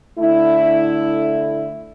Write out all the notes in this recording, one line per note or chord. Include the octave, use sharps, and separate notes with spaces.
D3 A3 E4